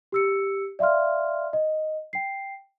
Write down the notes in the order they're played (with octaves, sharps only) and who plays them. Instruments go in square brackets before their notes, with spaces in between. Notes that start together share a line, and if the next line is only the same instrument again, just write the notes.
[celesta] G4 E6 C#7
D5 E5 F5 C6 F6
D#5
G5 C7